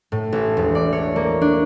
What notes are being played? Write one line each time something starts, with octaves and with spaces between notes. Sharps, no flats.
A2
A1
E1
D5
C#5
A#3
D4